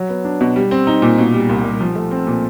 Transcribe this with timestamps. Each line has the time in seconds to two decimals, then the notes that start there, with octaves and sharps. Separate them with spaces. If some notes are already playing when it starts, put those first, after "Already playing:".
Already playing: F#3
0.09 B3
0.25 D4
0.41 B2
0.56 G3
0.71 C4
0.87 D#4
1.02 A#2
1.18 B2
1.34 G3
1.49 C2
1.64 C2
1.81 F3
1.96 A3
2.11 C4
2.27 A#2